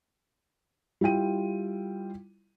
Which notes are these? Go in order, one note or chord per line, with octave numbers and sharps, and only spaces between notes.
G3 E4 F4 G5 D#7